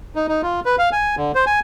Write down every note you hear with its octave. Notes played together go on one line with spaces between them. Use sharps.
D#4
D#4
F4
B4
F5
G#5
D3
C5
G#5